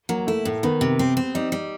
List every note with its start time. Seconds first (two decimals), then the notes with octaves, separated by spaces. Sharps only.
0.09 F#3 A#3
0.27 A3 E4
0.45 A2 A3
0.63 D#3 B3
0.81 C3
0.99 C4
1.17 C4
1.35 G3 D#4
1.52 G3